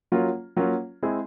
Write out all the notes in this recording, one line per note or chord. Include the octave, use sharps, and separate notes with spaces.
F#3 A#3 C#4 F4
F#3 A#3 C#4 F4
G#3 C4 E4 G#4